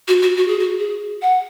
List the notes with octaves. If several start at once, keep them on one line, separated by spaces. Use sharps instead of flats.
F#4
F#4
F#4
G#4
F#4
G#4
F#5